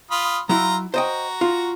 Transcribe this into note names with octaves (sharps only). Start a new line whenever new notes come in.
F4 B5 D#6
F#3 E4 F4 A#5
F#4 C5 D#5 G5 A#5
F4